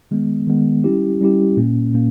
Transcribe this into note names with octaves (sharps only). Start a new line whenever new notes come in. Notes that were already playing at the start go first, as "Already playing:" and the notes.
D#3 G#3 B3
D#3 G#3 B3
G3 C#4 E4 G4
G3 C#4 E4 G4
A#2 A#3 C#4
A#2 A#3 C#4